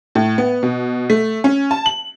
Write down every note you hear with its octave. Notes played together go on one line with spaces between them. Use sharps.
A2
B3
B2
A3
C#4
A5
F#7